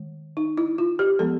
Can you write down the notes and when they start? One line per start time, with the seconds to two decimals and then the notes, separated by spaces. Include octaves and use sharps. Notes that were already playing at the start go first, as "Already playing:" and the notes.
Already playing: D#3 G#3
0.37 D#4
0.58 E4
0.78 F4
0.99 G4
1.19 F3 G#3 B3 A4